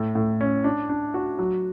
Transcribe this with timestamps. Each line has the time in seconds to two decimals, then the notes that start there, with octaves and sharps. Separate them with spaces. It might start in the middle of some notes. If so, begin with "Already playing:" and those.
Already playing: A2
0.15 A2
0.41 C#4
0.64 D4
0.89 D4
1.14 F#4
1.39 F#3